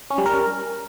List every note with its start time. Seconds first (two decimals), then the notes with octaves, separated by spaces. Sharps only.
0.10 C#4
0.18 G3
0.26 A#4